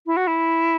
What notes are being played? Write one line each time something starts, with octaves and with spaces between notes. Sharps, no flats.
E4
F#4
E4